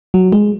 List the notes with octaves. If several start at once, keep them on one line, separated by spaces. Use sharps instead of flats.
F#3
G#3